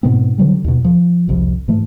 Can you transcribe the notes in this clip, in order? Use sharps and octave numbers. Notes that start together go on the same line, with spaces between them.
G#2 B2 B3 C4
D3 F#3 G3
D#2 B2
F3
G1 C2 F2
G#2 E3 A3